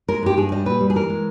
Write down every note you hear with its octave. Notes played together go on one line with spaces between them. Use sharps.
G#3 A#4
G2 G4
G2 G#4
G3 D#5
A#2 B4
G3
G#4
E3 A#4
G#3